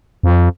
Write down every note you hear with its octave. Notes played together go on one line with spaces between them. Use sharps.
F2